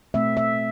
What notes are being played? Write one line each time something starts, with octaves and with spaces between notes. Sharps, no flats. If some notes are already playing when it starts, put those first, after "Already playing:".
B2 A3 C4 E5
E5